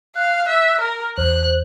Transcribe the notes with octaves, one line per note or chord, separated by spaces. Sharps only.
F5 F#6
E5
A#4 F6
E2 C5 F#6